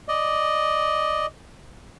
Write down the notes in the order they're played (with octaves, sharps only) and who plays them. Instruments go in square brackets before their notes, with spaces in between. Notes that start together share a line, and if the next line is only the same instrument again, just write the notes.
[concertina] D5 D#5